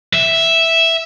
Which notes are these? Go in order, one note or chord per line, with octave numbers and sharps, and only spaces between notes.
E5